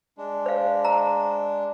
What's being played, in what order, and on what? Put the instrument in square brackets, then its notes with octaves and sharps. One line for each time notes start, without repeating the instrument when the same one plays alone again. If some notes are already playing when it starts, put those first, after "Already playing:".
[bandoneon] G#3 D4
[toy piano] C5 F5
A#5